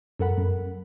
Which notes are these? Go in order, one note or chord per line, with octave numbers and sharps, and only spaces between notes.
F#2 A4 A#4 F#5 B5
F#2